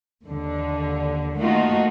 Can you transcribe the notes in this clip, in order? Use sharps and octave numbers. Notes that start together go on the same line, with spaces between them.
D#2 D3
D#3 A3 A#3 D#4 F4 F#4